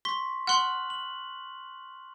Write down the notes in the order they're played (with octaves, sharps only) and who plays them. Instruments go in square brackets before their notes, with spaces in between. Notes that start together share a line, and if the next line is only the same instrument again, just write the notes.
[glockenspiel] C6 C#6 B6 [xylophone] G7
[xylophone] F#5 C6 [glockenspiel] F6 F#6 F#7
[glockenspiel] F#7